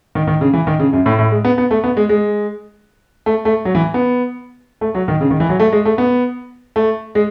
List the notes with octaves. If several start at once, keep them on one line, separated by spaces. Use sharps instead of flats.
D#3
D#3
C#3
E3
D#3
C#3
F#2
A2
A2
G#3
B3
B3
A3
B3
G#3
G#3
A3
A3
F#3
E3
B3
A3
F#3
D#3
C#3
D#3
E3
F#3
A3
G#3
A3
B3
A3
G#3